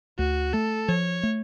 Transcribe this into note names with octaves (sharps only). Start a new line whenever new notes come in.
D2 F#4
A3 A4
F3 C#5
A3